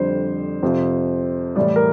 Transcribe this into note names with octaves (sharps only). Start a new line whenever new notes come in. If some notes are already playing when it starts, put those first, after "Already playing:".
Already playing: F2 D3 G3 C5
F2 C3 F3
A2 E3 G3 D5
A#4